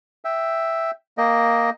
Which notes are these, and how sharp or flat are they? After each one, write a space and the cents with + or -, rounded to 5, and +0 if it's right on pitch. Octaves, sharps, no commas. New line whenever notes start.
E5 +0 G5 +0
A#3 +0 D#5 +0 G5 +0